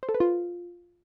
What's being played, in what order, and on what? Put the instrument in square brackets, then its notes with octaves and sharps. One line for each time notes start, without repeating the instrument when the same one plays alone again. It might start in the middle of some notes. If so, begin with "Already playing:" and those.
[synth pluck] C5
A4
B4
F4